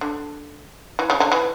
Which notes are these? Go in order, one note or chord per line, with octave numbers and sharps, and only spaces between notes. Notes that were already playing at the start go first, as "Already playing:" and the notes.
D3
E3
C#3
D3
E3